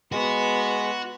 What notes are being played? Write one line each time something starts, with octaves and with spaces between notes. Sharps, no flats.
G#3 B3 F#4